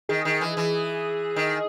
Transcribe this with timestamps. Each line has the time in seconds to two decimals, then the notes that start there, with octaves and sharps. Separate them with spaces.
0.09 D#3 G#4
0.25 D#3
0.41 E3
0.57 E3
1.36 D#3